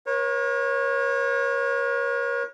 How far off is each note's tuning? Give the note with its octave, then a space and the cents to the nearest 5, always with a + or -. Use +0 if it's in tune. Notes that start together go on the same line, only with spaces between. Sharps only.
A#4 +45 C#5 -25